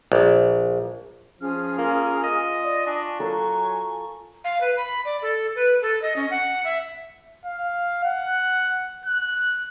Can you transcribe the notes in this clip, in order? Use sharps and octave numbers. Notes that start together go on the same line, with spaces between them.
A#1
F3 C#4 G#4 G#5 F6
A#3 F4
D#5
D5
D4 G#5 C#6
F#3 A4 A#4 A#5
F5
B4
B5
D5
A4
B4
A4
D#5
C#4
F#5
E5
F5
F#5
F#6